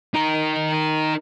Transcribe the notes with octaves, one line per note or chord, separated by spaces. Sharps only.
D#4 A#4